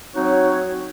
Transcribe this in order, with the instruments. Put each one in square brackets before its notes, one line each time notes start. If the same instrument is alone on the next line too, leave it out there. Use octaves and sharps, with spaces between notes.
[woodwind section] F#3 C4 D#4 F#4 C#5